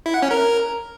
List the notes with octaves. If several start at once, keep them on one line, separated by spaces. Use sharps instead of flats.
E4
F#5
C#4
A#4